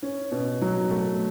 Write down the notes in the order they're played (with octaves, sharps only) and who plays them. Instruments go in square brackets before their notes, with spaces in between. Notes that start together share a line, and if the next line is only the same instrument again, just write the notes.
[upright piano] C#4
B2
F#3
A3